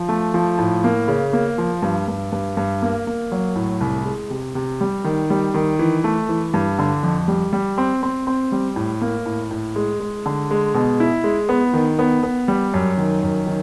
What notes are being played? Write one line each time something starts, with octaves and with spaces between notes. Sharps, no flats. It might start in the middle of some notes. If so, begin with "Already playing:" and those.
Already playing: F3
A3
F3
A2
A#3
C#3
A#3
F3
G2
G2
G2
G2
A#3
A#3
F#3
A2
C2
G#3
C3
C3
G3
D#3
G3
D#3
E3
A3
E3
G2
D3
F2
G3
G3
C4
C4
C4
G3
A2
A#3
A2
A2
G#3
G#3
D3
G#3
B2
E4
G#3
B3
D#3
B3
B3
G3
F#2
D#3
F#2
D#3